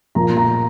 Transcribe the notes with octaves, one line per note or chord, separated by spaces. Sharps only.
A#2 F3 A#3 A#5
A#5